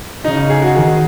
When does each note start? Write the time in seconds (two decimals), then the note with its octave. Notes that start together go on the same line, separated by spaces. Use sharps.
0.24 C#3 D#4
0.37 D#4
0.50 G#4
0.62 F#4
0.75 D#3 G#4